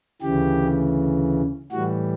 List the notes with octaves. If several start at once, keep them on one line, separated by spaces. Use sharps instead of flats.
D2 C#3 E3 G4
A2 E3 G3 F#4